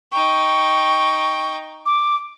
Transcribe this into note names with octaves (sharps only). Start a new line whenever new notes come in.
D#4 G5 C#6
D6